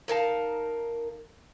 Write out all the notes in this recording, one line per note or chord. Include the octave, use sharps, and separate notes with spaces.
D#4 A#4 F5 A5